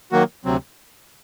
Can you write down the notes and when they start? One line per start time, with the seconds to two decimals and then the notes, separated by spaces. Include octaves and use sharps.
0.12 D#3 F#3 A#3 F#4
0.45 D2 C3 F#3 C4